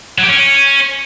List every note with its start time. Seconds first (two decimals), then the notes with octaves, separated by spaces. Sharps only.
0.18 F#3
0.23 G4
0.28 C#4